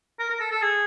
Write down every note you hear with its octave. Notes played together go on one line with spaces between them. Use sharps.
A#4
A#4
A4
A4
G#4